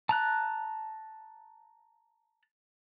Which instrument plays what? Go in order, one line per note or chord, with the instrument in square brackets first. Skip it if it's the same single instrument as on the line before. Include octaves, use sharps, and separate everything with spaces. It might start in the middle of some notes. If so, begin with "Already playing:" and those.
[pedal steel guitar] A5 A#5 F#6